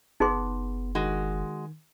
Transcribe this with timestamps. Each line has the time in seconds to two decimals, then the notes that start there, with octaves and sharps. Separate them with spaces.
0.20 F#1 B3 D#4 G#4 C6
0.95 D#3 G#3 F#4